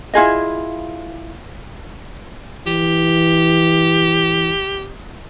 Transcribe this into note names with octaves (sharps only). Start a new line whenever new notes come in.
E4 F4 G#4 D#5
E3 G4